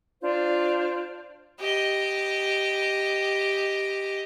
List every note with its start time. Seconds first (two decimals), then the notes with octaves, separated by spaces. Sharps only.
0.22 D4 F4 C5
1.60 G4 D#5